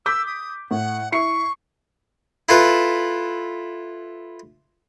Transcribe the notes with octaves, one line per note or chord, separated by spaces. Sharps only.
D6 E6 G6 B6
D#6
A2 F#5
E4 C#6 C7 C#7
E4 F4 A4 B4